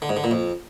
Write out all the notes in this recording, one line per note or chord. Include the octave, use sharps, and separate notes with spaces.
D3
G#2
D3
A#2
F2